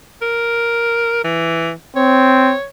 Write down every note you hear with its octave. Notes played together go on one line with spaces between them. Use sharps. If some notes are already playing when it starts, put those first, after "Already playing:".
A#4
E3
C4 C#5